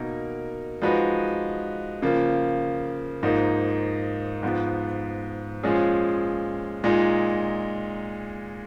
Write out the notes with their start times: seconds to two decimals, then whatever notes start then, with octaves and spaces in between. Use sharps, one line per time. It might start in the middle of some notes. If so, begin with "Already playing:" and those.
Already playing: B2 A#3 D#4 A#4
0.82 F3 G#3 D#4 F#4 B4
2.02 C#3 F3 A#3
3.23 G#2 F3 A#3 D#4
4.43 G#2 F3 B3
5.63 A#2 F3 G#3 C#4 G#4
6.84 A#2 G#3 D#4